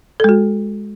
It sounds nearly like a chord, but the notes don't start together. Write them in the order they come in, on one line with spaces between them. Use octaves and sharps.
A4 G#3 F#4